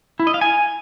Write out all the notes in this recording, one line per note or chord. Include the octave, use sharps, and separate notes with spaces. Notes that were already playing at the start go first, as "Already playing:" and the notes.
E4
D#5
F5
G#5